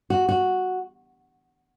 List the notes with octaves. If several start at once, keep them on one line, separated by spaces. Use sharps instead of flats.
F#4
F#4